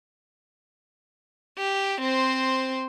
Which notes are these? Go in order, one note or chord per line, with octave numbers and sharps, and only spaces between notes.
G4
C4 C5